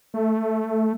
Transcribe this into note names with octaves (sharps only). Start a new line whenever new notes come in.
A3